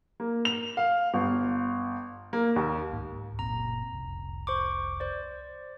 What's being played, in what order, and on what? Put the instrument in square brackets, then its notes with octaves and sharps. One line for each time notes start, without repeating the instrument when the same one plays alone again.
[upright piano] A#3
F7
F5
G1
A#3
D#2
[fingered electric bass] C#2 G#2
[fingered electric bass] F#1 A#2 C4 [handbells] A#5
[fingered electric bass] F1 C2
[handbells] C5 C#6 D6
C5 D5